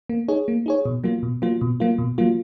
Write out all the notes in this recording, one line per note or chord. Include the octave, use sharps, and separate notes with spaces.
A#3
D#4 G#4 C#5
A#3
D#4 G#4 C#5
B2
F#3 A#3 F4
B2
F#3 A#3 F4
B2
F#3 A#3 F4
B2
F#3 A#3 F4